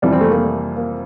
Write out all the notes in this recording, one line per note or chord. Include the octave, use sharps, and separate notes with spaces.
F2 C3 E3 G3 D4
C4
A3
A#3
A#3